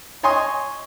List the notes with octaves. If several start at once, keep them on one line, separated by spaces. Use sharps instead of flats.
C#5 D#5 G#5 C6 C#6 D#6